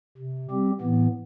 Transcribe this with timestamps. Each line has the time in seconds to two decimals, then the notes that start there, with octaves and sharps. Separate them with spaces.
0.18 C3
0.51 G3 C4 G4
0.81 A2 E3 B3